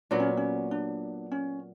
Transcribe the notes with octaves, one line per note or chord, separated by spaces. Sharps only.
A#2 F#3 B3 D4
C#4
C#4
D4
C#4